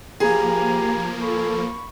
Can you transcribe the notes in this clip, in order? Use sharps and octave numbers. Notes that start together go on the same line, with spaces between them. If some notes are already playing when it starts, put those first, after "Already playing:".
F3 A#3 G4 G#4 G#5 A#5 B5
A4 B5 C#6